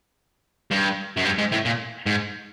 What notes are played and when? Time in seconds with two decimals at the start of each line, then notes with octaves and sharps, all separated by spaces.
0.71 G2
1.17 F#2
1.25 G2
1.39 G#2
1.52 A2
1.66 A#2
2.06 G#2